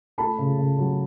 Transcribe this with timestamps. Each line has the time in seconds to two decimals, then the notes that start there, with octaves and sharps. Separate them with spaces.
0.18 A3 A5 B5
0.38 C#3
0.59 C#3
0.79 F#3